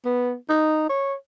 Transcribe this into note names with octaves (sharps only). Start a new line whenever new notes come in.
B3
D#4
C#5